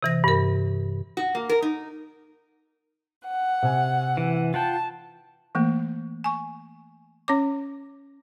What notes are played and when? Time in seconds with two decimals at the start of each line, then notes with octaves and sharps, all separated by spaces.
0.03 C3 E3 A#6
0.24 G2 A#4
1.17 F#4
1.35 A#3
1.49 A#4
1.62 D#4
3.26 F#5
3.63 C3 G#5
4.17 E3
4.54 F4 F#5 G5 A5
5.55 E3 A3 A#3
6.24 G#5 C#6
7.28 C#4 C#5 D6